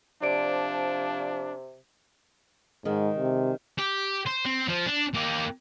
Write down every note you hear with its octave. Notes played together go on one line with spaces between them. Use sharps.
C3 F3 D4 D5 D7
G#2 D#3 G#3
C3
G4
C5
C4
F3
D4
A#3 G4